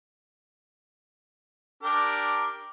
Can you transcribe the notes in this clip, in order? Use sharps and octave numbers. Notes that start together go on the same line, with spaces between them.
D4 G4 A#4